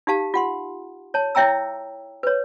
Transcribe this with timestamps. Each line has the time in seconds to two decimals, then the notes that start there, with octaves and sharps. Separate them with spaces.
0.07 D#4 G4 F5 A5
0.34 F4 F#5 C6
1.14 C#5 A5
1.35 E4 C#5 E5 G5 A#5 E6
2.23 B4 C#5